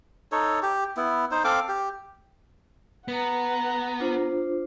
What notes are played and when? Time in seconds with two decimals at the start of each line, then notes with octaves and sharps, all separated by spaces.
0.32 D#4 A4 C#5
0.63 G4
0.97 B3 E4
1.31 D#4 C5
1.44 C4 A4 F5 D6
1.69 G4
3.08 B3 B4 F#5 A#5
4.00 D4 F4 C5